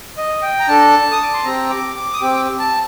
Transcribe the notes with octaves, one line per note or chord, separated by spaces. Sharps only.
D#5
G5
A#5
D4 A4 A5
D#6
D6
C6
C4 G4 A#5
D6
D6
D#6
C4 G4 D6
A5